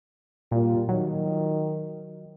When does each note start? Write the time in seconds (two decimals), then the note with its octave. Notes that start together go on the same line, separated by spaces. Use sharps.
0.52 A#2 G3 A#3 F4
0.89 D#3 F#3